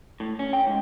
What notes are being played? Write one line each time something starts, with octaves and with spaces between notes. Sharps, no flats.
A2
C#4
G5
G#2